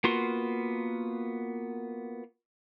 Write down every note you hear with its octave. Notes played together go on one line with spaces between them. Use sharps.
A#3 B3 F4 F#4 C6